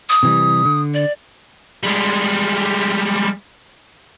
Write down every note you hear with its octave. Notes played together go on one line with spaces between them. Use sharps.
D#6
C3 E3 G3
D3
D5
G3 G#3